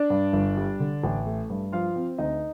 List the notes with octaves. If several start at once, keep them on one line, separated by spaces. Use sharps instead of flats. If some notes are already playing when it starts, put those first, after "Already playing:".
Already playing: D4 D5
G2
G1
G3
D3
A1
A3
G2
F3 F4 F5
C4
D2 D#4 D#5